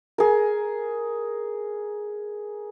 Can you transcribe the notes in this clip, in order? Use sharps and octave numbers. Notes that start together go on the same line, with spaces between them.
G#4 A#4